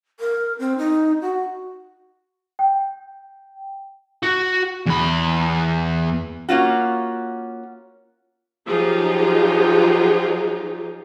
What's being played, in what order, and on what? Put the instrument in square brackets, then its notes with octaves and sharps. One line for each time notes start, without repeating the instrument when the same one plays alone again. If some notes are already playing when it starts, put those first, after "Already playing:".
[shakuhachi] A#4
C4
D#4
F#4
[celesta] G5
[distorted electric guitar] F#4
E2 B5
[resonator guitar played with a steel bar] A#3 C#4 F4 F#4
[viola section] F3 F#3 D#4 F4 G4 G#4